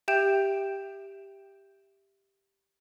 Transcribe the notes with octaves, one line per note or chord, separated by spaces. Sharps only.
G4 E5 G5 G6 D7 E7